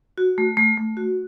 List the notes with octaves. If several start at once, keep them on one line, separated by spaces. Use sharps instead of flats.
F#4
A3
A3
A3
F#4